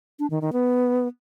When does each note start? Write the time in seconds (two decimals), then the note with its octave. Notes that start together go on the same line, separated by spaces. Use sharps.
0.19 D4
0.30 D#3
0.42 D#3
0.53 B3